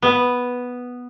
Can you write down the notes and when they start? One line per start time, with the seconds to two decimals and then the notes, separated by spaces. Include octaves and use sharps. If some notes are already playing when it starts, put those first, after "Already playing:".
0.02 B3